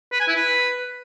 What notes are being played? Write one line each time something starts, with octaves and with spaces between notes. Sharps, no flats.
B4
G#5
E4
B4